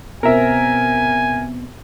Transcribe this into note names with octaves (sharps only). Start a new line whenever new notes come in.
B2 C4 A#4 E5 G#5